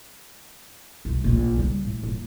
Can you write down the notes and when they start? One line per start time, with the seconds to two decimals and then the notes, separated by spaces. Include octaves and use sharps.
1.05 C2
1.24 A#1 A#2
1.58 C#3 G3
1.85 A2
2.03 D#1